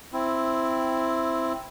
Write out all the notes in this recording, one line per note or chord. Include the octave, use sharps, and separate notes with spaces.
C4 E4